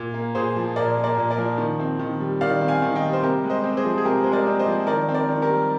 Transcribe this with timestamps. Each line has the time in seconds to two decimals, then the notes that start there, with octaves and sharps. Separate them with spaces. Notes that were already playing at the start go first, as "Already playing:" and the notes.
Already playing: A#2
0.14 A#3
0.35 A#2 G#4 C5
0.56 F3
0.76 A#2 A#4 D5
0.97 A#3
1.04 A#4 D5
1.17 A#2
1.30 A#4 D5
1.38 F3
1.58 D#3
1.80 C4
1.99 D#3
2.20 G3
2.41 D#3 D5 F5
2.61 C4
2.68 F5 G#5
2.82 D#3
2.95 D#5 G5
3.02 G3
3.13 C5
3.22 C3 G4 A#4
3.44 G#3
3.50 C5 D#5
3.64 C4
3.77 G#4 C5
3.84 F3
3.98 G#4
4.05 C3 G4 A#4
4.24 G#3 C5
4.32 A#4 D5
4.47 C4
4.59 C5 D#5
4.67 F3
4.87 D#3 A#4 D5
5.09 C4
5.14 A#4 D5
5.29 D#3
5.42 G4 A#4
5.49 G3